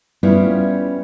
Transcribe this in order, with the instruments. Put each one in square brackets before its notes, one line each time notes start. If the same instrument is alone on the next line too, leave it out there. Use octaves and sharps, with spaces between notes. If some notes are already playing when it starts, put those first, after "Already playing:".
[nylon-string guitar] G3 B3 C#4 E4 F4